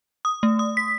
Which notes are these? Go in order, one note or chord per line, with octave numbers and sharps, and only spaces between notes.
D#6
A3
D#6
B6